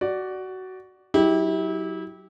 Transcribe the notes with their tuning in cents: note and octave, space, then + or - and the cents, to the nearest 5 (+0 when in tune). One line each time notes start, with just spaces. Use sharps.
F#4 +15 D5 +0
F#3 +15 E4 -30 G4 +0